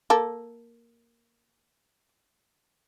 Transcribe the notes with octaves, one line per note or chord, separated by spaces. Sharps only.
A#3 A4